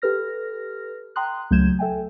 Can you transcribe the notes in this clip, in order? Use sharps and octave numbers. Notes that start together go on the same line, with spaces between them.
G4 A4 B4 F6 A#6
G5 A#5 C6 D#6 F#6
C#2 F#3 A3 G6 G#6 E7
A4 E5 G5 G#5